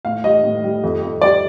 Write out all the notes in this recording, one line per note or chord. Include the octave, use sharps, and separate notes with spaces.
A2 F5
G3 D#5
A2
G3
F2
F2
G3 D5